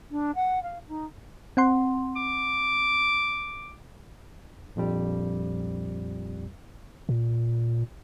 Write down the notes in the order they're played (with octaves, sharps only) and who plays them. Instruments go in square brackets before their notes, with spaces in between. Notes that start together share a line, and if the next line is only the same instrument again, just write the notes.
[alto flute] D4
F#5
F5
D#4
[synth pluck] C4 F#5 C6
[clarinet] D6
[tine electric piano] A#1 F2 G3
[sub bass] A#2